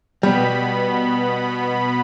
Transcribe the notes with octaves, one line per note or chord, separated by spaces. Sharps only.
B2 G3 B3 B5